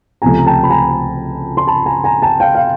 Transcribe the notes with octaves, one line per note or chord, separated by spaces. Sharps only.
C#2 C3 F3 A3 G#5 A#5
A#5
G5 A5
B5
G#5 A#5
C6
A5 B5
G#5 A#5
G#5 A#5
G5 A5
F5 G5
F5